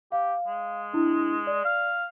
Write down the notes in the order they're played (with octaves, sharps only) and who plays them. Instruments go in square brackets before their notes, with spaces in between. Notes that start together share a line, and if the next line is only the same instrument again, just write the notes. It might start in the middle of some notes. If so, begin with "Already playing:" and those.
[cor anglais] G4 [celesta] F5
[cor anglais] G#3
[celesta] D4 E4
D5
[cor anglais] F5